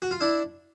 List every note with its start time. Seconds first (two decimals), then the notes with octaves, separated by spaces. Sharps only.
0.02 F#4
0.11 F4
0.21 D4 E4